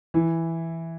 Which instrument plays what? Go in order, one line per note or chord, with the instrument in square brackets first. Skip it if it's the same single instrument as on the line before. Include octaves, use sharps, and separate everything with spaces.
[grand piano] E3 E4